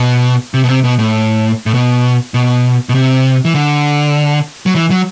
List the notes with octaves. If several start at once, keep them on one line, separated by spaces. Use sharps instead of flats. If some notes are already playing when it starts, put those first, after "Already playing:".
Already playing: B2
C3
B2
C3
B2
A2
A2
B2
B2
B2
C3
E3
D3
F#3
E3
F#3